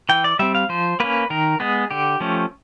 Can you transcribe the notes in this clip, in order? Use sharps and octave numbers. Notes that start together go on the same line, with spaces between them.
E3 G5
D5
G3 C4 E5
F5
F3 C5
A#3 C#4 B4
D#3 A#4
G#3 B3 G#4
D3 G4
F3 A3 C#4